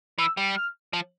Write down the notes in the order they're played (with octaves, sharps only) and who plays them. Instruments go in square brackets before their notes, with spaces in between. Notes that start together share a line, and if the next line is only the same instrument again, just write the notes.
[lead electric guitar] E3 [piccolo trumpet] E6
[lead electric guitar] G3
[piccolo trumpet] F6
[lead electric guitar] F3